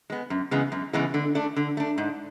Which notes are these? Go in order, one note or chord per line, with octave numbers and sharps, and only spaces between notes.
G#3 B3
F#2
C#3 E3 G#3 B3
F#2
C#3 E3 G#3 B3
D3
A3 D4
D3
A3 D4
G#2